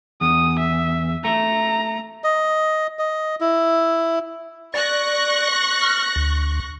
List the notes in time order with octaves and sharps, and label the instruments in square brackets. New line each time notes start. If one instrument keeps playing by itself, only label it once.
[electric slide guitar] E2 [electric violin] D#6
[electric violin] E5
[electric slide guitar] A3 [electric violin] A#5
[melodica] D#5
D#5
E4
[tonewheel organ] D5 [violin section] C#6 F#6 A#6
[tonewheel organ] F6
D2